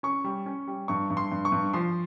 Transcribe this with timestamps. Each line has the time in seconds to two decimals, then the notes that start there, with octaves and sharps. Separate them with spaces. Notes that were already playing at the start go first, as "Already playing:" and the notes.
0.03 C#4 C#6
0.24 G3
0.46 C#4
0.67 G3
0.88 G2 C#6
1.10 G2
1.17 C6
1.31 G2
1.45 C#6
1.52 G2
1.73 F3 C6